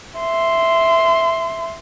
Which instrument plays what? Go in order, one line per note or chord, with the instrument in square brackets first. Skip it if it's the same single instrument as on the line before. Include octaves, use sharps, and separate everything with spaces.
[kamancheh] E5 C6